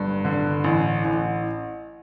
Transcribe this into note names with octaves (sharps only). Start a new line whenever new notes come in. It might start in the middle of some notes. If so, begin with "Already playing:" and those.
Already playing: G1 G2
D3
A1
A1